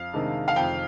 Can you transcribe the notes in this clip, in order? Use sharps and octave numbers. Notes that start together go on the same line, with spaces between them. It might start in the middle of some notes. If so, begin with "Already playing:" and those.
Already playing: F2 F5
C3 D#3 G#3 D4
F5
F2 G5